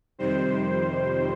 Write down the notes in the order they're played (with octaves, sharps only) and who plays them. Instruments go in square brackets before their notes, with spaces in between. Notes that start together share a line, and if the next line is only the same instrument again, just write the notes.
[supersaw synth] F2 C3 D#3 G3 C5